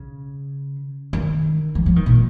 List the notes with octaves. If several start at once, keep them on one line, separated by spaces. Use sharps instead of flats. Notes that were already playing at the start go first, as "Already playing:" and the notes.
Already playing: C#3
D#3
F3
F3
D#3
A#2